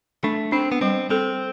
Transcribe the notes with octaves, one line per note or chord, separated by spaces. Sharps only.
A3 D4
C4 D4
B3
G3 C4
C4 A4